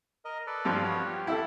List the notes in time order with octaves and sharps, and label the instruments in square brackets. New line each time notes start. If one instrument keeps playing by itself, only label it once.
[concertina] A#4 D#5
A4 B4 D5
[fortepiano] G2 F3
[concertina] B3 F#4 C#5
G4
[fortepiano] E4 A4